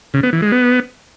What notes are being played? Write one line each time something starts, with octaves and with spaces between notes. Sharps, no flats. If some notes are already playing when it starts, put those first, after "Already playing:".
C#3
B3
E3
G#3
B3